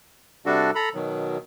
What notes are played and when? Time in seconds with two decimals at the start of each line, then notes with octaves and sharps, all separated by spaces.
0.46 C3 G3 D4 F#4 A4
0.75 A4 A#5 B5
0.94 B2 D#3 F#3